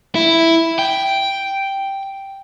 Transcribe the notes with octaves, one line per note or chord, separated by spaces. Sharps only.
E4
G5